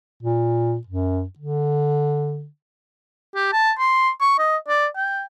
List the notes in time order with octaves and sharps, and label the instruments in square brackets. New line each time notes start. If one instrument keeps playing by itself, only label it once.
[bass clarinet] A#2
F#2
D3
[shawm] G4
A5
C6
C#6
D#5
D5
G5